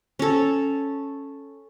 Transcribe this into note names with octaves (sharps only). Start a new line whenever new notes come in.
C#4 A4